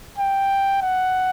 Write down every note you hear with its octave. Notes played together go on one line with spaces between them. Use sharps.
G5
F#5